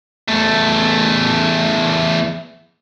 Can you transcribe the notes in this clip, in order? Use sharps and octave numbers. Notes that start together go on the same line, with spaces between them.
E2 A3